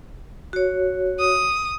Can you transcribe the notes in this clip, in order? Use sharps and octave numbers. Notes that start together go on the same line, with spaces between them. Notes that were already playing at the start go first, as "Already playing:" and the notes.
F#4 C#5
D#6